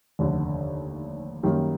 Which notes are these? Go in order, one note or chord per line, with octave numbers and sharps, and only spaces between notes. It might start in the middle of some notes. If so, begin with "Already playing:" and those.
F1 D#2 D3
F#2 D#3 G3 A#3